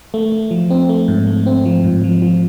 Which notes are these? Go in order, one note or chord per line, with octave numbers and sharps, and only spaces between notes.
A3
A3
F3
C4
A3
G#2
A3
C4
F3
G#2
F3
F3